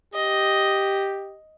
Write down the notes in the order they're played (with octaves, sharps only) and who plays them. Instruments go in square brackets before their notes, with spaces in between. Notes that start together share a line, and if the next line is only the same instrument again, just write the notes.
[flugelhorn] G4 [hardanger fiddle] D#5